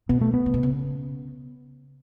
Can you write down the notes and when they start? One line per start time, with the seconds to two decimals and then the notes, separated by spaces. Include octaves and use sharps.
0.09 B2 B3
0.21 A3
0.34 B3
0.46 C#3
0.54 B2
0.63 C#3